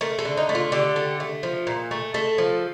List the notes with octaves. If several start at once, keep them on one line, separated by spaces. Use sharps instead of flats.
A3 A#4
A4
D3
D#4
A3
F4
D3 G4
A3
A3
F3
A#2
A3
A3 A4
F3